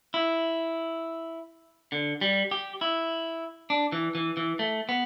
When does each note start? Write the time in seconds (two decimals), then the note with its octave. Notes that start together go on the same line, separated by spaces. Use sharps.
0.14 E4
1.92 D3
2.21 G3
2.51 G4
2.81 E4
3.70 D4
3.92 E3
4.15 E3
4.37 E3
4.59 A3
4.89 B3